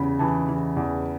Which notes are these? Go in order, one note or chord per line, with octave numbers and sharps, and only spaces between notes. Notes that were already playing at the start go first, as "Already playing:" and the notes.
Already playing: E2 C#3 B5
E3 A5
E3
E2